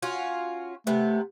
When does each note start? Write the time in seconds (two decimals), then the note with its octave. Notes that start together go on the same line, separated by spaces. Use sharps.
0.03 C#4 F4 F#4
0.87 C3 A3 B3